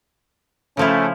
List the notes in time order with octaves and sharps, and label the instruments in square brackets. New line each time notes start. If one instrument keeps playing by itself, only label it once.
[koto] C#3 F3 E4 [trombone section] A3 C#4